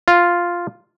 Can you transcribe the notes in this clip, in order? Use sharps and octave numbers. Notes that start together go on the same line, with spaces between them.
F4